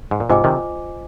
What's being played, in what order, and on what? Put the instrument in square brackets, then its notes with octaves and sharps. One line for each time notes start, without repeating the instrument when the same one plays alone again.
[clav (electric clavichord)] G#2
A#2
[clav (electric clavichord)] G#2 C3 [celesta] F4 C5 D#5 G#5 D6
[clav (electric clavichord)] C3 D#3